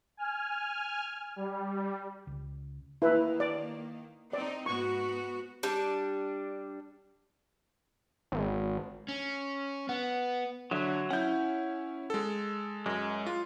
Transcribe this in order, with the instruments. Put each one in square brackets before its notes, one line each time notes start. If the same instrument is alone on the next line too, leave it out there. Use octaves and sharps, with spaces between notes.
[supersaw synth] G#5 F6
G3
[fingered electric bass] C#2
[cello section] D#3 A#3 [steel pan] E4 B4
[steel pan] D5
[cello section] C4 D#4 [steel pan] D5
[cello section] G#2 B3 F#4 [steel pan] C#6
[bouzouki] G3 D4
[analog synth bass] G#1
[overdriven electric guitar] C#4
[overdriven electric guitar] B3 [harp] F#5
[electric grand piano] D3 [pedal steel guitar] F#3 E5
[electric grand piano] C#4 E4 [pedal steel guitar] F#5 G6
[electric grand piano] G#3 A4
[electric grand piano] F#2 [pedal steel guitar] G#3
[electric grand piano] F4